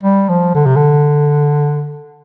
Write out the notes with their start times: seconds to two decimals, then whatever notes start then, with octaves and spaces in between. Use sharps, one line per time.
0.03 G3
0.29 F3
0.54 D3
0.66 C3
0.76 D3